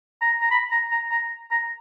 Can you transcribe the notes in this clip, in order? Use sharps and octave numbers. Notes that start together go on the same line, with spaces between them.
A#5
A#5
B5
A#5
A#5
A#5
A#5